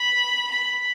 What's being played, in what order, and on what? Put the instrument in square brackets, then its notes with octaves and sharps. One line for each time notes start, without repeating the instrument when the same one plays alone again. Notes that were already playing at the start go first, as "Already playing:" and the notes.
Already playing: [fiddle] B5
B5